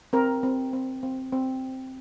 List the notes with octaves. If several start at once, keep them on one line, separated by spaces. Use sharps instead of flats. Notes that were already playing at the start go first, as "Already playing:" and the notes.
C4 A#4
C4
C4
C4
C4